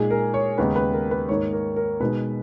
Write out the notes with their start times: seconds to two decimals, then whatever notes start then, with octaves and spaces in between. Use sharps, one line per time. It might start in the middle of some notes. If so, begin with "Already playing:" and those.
Already playing: A#2 G#3 D#4 G#4
0.10 A#4
0.34 C#5
0.58 D#2 C#3 G#3 B3 D#4 B4
0.76 B4
0.93 A#4
1.11 B4
1.29 G#2 D#3 A#3 D#4 C#5
1.53 A#4
1.76 A#4
2.00 B2 G#3 D#4 B4